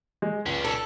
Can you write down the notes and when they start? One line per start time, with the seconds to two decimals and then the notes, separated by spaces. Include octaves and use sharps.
0.22 G#3
0.46 C#2 C#4 D4
0.65 A4